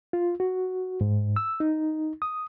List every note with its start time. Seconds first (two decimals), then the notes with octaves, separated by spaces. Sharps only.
0.13 F4
0.40 F#4
1.01 G#2
1.36 E6
1.60 D#4
2.22 D#6